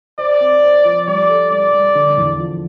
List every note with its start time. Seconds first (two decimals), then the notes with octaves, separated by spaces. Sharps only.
0.18 C5 D5
0.41 C4
0.63 C5
0.85 F3
1.07 G3 D5
1.29 A4
1.51 G3 D5
1.73 G3
1.95 D3
2.18 E2
2.40 F3